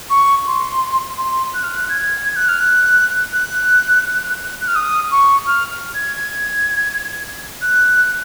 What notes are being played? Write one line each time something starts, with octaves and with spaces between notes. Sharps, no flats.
C#6
C6
C6
F#6
F6
F#6
G#6
G#6
F#6
F6
F#6
F#6
F#6
F6
D#6
C#6
F6
G#6
F#6